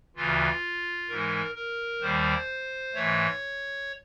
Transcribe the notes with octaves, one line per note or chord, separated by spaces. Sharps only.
D2 C#3 E3 F4
G#2 E3 G#3 A#4
A#4
D#2 D#3 G3 A#3 C5
G#2 E3 A3 C#5